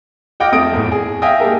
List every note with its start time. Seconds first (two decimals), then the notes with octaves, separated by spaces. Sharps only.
0.40 D#5 F#5 G5 D6 F6 A#6
0.52 F2 A3 C4 D#6 D7
0.73 E2 A2
0.92 G#4
1.22 E5 F5 G5 G#5 D#6 A#6
1.40 G#3 A#3 G4 A4 A#4